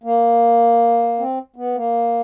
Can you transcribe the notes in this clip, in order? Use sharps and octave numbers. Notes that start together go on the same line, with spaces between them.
A#3
C4
B3
A#3